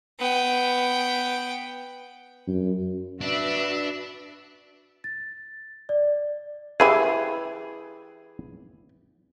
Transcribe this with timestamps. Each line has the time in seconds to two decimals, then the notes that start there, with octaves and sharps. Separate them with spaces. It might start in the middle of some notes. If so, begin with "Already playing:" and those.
0.19 B3 G5
2.47 F#2
3.21 D4 F#4 B4 E5
5.04 A6
5.89 D5
6.80 E3 E4 G4 G#4